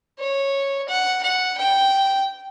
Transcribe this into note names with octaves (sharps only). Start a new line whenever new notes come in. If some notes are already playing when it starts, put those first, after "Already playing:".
C#5
F#5
F#5
G5